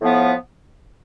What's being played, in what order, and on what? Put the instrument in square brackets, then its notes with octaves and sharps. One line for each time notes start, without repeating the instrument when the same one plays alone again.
[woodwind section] A2 F3 B3